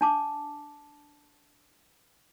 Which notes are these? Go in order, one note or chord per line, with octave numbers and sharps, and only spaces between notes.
D4 A5 D6